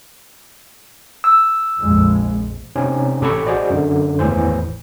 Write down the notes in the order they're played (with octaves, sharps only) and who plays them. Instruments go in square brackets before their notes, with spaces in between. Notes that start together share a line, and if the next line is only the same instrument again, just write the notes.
[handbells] E6
[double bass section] A#1 F2 G#3
[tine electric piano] C3 C4 C#4 D#4
A1 G4 A4 B5 C#6
F#4 G#4 C5 D5 D#5
F#2 D3
G#1 E2 A2 E3 C5